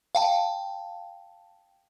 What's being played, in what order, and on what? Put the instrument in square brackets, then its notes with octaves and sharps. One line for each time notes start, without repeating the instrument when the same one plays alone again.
[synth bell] F5 G5 A5